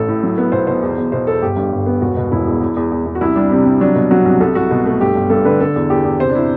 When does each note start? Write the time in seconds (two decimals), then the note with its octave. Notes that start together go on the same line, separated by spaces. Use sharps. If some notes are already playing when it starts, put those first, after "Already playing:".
Already playing: A1 A4
0.08 A2
0.23 F#3
0.38 B3
0.52 B1 C5
0.67 B2 C5
0.82 E2
0.98 E2
1.12 B2 C5
1.27 E2 A4
1.42 G1 G4
1.57 G2
1.73 G1
1.86 B3
2.01 E1 F#4
2.17 B2
2.32 E1 E4
2.47 E2
2.61 E2
2.77 E2
2.92 E2
3.06 E2
3.15 F#4
3.21 C2 E4
3.36 G3 D4
3.51 C3 C4
3.66 G3
3.81 F#3 D4
3.95 B2
4.11 F#3 F#4
4.26 C2
4.40 C2 A4
4.55 C2 F#4
4.71 B2
4.86 A3
5.01 G2 G4
5.15 G1
5.30 G2 A4
5.45 D3 B4
5.60 D3 A4
5.76 E2
5.90 E2 G4
6.04 E2
6.20 C3 C5
6.30 D4
6.35 C3 E4